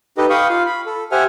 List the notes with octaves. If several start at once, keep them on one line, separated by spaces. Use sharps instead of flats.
D#4 G4 A4 B4 D#5
F5 G5 B5 C#6 D#6
F4 F5
B5
A4
G4 C5 E5 F#5 G#5 F6